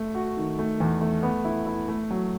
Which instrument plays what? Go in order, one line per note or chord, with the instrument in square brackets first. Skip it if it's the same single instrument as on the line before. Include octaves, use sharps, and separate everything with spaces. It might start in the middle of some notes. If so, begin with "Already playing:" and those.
Already playing: [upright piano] A3
F#4
D#3
A3
E2
A3
B3
E4
E4
A3
F#3